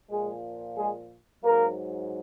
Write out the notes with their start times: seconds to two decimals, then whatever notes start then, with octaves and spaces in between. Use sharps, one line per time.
0.10 A#2 F3 G#3 G#4
0.77 G#3 G#4
1.44 G#2 F#3 A#3 A#4